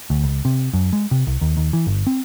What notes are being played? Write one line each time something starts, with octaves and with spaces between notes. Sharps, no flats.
D2
C#2
C3
F#2
G#3
C3
C2
D#2
D#2
E3
G1
C4